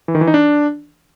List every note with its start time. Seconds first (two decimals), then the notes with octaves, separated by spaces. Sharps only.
0.08 E3
0.15 D#3
0.21 E3
0.27 D#4
0.34 D4